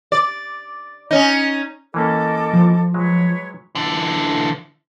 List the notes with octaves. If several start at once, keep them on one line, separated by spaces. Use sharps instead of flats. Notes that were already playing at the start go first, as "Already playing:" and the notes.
D5
C#4 D#4
E3 A#3 C#4 A4 D#5 D6
F3
F#3 G#3 B4 C#5
D3 E3